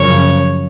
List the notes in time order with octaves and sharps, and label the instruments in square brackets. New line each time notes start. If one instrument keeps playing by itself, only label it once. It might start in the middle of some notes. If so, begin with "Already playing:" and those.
Already playing: [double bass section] F#2 C#3 F3 [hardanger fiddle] C#5